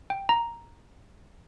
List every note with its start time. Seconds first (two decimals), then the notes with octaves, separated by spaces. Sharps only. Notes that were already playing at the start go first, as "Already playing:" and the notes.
0.10 G5
0.29 A#5